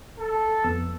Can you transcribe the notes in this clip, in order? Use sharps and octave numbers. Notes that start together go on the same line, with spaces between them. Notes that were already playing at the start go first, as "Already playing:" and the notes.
A4
F2 B3 E6